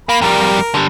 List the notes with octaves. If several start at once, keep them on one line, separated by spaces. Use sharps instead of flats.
A#3 B5
F2 G3 A#4
D3 G3